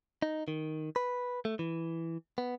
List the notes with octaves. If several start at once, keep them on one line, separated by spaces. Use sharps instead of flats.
D#4
D#3
B4
A3
E3
B3